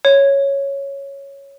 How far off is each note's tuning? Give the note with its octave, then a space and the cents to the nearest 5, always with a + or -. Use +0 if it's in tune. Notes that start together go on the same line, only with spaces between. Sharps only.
C#5 +0